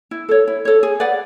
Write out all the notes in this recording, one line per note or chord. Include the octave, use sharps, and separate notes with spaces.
E4
A4 C#5
E4
A4 C#5
G#4
B4 D5 F#5